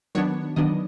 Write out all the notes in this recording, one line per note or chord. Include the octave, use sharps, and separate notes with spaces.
D#3 F#3 B3 D4 C#5
D#3 F#3 B3 D4 D#5